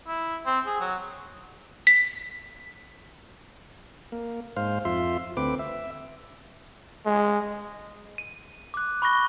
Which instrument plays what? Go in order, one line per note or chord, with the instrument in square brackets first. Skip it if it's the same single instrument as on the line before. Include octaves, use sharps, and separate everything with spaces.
[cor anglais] E4
C4
G#4
F#3
[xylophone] B6
[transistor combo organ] A#3
G#2 C5 F5
F2 F4 E5 C6
D2 C4 B4 D6
E5
[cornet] G#3
[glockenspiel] D#7
D6 F#6
B5 C#6 F#6 A#6 G7